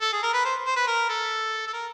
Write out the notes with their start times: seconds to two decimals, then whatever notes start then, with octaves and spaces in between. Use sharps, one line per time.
0.01 A4
0.13 G#4
0.23 A#4
0.33 B4
0.45 C5
0.66 C5
0.77 B4
0.87 A#4
1.09 A4
1.67 A4
1.73 A#4